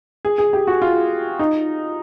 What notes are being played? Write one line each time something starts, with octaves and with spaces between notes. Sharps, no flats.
G#4
G#4
G4
F#4
F4
D#4